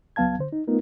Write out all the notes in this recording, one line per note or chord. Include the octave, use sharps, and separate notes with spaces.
C#2 F#3 B3 F5 A5 G#6
D3 C5
D#4
A3 B3 D#4 F4 A#4